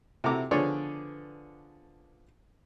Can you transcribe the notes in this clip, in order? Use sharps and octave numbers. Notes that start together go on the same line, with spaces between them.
C3 E4 F#4 A4 A#5 D6
D3 F3 B3 G#4 C#5 D5